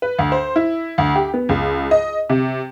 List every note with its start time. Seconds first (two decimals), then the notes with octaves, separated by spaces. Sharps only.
0.02 B4
0.19 D2
0.32 C5
0.56 E4
0.98 D2
1.16 G4
1.34 B3
1.49 C#2
1.91 D#5
2.29 C3